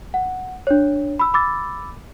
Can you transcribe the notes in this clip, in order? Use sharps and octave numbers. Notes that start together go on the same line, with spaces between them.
F#5
D4 C#5
B5 E6
B5 D6 E6 A6